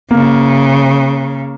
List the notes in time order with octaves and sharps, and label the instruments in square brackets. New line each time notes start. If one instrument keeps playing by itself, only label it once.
[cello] C#3 [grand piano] A#3